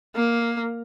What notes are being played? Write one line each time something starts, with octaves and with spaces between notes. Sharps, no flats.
A#3